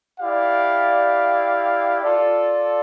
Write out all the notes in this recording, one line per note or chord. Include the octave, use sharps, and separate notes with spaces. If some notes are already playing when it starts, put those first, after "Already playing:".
E4 G4 D5 F5
F4 A4 D5